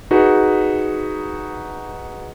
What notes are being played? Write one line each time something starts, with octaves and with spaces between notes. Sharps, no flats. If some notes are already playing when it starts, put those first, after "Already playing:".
D#4 F#4 G#4 B4